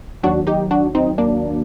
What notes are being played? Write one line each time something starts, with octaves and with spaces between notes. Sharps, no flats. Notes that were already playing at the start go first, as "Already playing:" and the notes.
D#2 D#3 F#3 D4 F#4
D#4 G4
D4 F#4
C4 D#4
A#3 D4